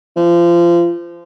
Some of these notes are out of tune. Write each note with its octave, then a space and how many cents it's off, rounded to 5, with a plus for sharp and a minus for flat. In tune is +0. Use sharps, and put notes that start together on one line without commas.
F3 -25